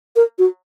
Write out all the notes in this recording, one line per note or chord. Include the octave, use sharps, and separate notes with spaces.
A#4
F#4